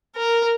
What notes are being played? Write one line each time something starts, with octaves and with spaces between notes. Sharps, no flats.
A#4